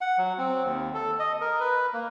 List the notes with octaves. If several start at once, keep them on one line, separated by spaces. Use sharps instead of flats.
F#5
F#3
C4
D#2
A4
D#5
A#4
B4
A#3